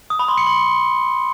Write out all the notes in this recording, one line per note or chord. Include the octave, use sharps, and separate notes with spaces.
D#6
B5
C6
C#7
C6